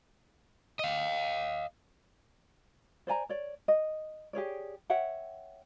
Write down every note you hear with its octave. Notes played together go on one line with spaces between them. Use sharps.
D#5 F5
C5 D5 G#5 A#5
C#5 D5
D#5
G4 G#4 C#5 D5
C#5 E5 F#5 G5